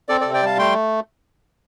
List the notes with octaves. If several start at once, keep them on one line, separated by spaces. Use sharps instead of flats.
C4 A4 D5
C3 A4 D5
D5 G5
G3 F5 A5
A3 G5 C6